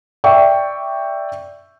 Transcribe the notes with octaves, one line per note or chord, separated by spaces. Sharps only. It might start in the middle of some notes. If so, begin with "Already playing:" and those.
D5 E5 G5 C#6